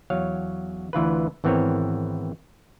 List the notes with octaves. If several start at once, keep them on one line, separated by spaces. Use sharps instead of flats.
E2 F#3 C#5 F5
D2 E3 F4 B4
G#1 E3 B3 C4 A#4 C#5